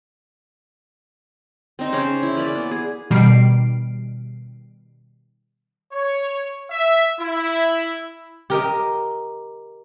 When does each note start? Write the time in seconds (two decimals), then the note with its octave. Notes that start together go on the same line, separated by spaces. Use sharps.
1.79 C4 D#4
1.92 C#3 C#4 C5 D6
2.23 E4
2.37 A#3 D5 B5
2.55 B3
2.71 G#4
3.11 B2 D#3 G3 F6 C7 D7
5.93 C#5
6.71 E5
7.21 E4
8.50 G4 A#4 D#5